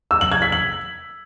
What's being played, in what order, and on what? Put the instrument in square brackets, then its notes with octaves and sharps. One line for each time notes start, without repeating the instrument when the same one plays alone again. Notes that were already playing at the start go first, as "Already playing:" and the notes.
[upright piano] E6
F#7
G#6
B6
F#7